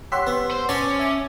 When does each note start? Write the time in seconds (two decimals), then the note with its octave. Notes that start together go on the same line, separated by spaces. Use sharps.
0.12 G4 C#5 F#5 C6 E6 B6
0.27 B3
0.51 C5
0.69 C#4 C#5 D5 A5
0.99 E5 G#5 D6